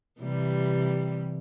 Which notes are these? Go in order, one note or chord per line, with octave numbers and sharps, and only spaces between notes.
C3 E3 G3